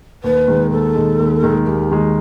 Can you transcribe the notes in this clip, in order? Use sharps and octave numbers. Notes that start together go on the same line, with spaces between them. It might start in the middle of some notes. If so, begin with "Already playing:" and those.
D#2 B4
D#3 G#3
D#2 A4
D#3 G#3
D#2
D#3 G#3
D#2 G4
D#3 G#3